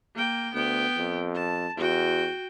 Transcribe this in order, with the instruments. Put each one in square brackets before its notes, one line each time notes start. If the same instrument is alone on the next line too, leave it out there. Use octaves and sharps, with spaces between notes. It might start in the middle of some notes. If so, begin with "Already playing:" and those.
[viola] A#3 G5
[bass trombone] D2 [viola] B3 G5
[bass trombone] F2
[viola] A5
[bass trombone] E2 [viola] F#4 G5